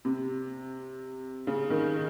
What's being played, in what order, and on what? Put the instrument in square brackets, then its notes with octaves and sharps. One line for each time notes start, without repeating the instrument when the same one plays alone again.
[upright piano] C3
C#3
D#3